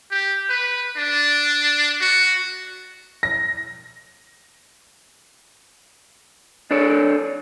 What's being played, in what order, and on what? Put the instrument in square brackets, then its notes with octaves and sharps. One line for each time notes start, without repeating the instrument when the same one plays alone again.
[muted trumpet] G4
B4
D4
F#4
[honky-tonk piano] A#6
[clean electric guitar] D4 A4 C#5